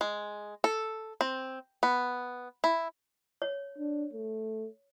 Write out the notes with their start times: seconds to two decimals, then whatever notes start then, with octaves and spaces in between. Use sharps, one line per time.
0.01 G#3
0.64 A4
1.21 C4
1.83 B3
2.64 E4
3.42 C#5
3.78 D4
4.14 A3